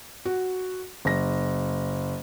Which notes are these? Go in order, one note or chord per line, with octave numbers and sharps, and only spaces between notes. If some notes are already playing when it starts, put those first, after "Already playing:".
F#4
F#1 A#6